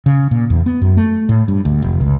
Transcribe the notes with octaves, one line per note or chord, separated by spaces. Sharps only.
C#3
A#2
E2
B3
F#2
A3
A2
G2
D2
F1
C#2